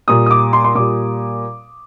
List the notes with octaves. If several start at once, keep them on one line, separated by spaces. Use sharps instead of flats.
A#2 G3 D#6
D#6
D6
C6
C6
A#2 G3 D6